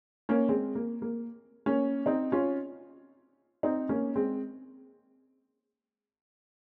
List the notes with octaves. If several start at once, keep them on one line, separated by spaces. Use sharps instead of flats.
A#3 C#4
G#3 C4
A#3
A#3
A#3 C#4
C4 D#4
C#4 F4
C4 D#4
A#3 C#4
G#3 C4